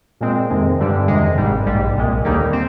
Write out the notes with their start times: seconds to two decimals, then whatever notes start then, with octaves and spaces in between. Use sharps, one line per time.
0.21 A#2 G#3 C4
0.50 F2 C3 D#3 G#3
0.79 G2 D3 G3 D4
1.08 F2 C3 D#3 G#3
1.37 G#1 G#2 G3
1.66 A#1 G#2 G3
1.95 C2 A#2 G#3
2.24 D#2 D3 G3 A#3 D#4
2.53 C4